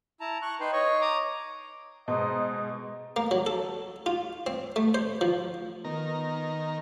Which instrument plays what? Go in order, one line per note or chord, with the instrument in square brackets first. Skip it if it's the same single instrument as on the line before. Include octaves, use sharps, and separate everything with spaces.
[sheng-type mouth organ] E4 A5 A#5
C#6 F#6
D#4 B4 G5 C6
C#5 D#5 C#6
A#5 D6 D#6
[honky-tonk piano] B2 [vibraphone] G#3 G#4 [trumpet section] D#4 C5 D#5
[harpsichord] A#3
F#3
A4
F4
C4
A3
C5
F3
[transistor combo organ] D#3 A#4 [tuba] B3